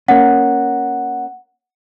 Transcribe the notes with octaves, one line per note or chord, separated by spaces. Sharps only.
A#3 C#4 F#5